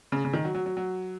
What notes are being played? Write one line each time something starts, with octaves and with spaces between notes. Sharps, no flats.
C#3
C#3
D#3
F#3
F#3
F#3
F#3